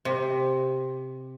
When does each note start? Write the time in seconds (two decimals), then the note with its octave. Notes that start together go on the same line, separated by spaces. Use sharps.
0.05 C3